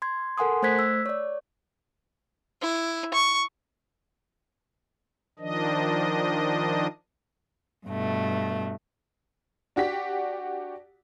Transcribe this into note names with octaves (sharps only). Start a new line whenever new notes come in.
C6 G#6
A4 A#4 F#5 G#5 C6 D#6
A3 C5 F#6 G#6 B6
E6
C#5 D5
E4
C#6
D#3 F3 D4 D#5
G2 B2 A3
D4 F#4 G4 B6